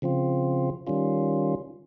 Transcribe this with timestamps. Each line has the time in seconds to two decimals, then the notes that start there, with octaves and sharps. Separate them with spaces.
0.02 C#3 F3 C4 F4
0.87 D#3 G3 C#4 F4